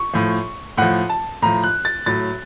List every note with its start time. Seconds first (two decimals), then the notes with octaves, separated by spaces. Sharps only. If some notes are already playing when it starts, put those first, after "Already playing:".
Already playing: C#6
0.13 A2 F3
0.77 A2 F3 F#5
1.09 A5
1.42 A2 F3 A#5
1.64 F#6
1.85 A6
2.06 A2 F#3 A6